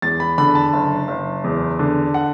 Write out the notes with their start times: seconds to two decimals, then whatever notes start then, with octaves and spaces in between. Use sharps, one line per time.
0.02 E2 A6
0.20 B5
0.38 D3 B5
0.55 A5
0.73 F#1
1.08 F#1
1.44 E2
1.79 D3
2.14 F#5